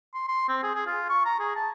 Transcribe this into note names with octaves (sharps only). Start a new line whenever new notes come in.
C6
C6
C4
G#4
G#4
F4
C#6
A#5
G#4
A5